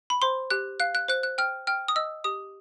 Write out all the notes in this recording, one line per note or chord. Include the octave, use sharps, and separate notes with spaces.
B5
C5 C6
G4 F#6
F5 F#6
F#6
C5 F#6
F#6
G5 F6
G5 F6
D#6
D#5 E6
G4 D#6